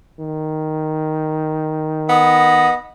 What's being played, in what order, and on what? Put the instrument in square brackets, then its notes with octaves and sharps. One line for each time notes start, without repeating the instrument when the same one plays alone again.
[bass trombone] D#3
[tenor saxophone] B3 [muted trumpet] D#5